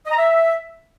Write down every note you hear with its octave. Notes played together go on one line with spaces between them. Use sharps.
D#5
A#5
E5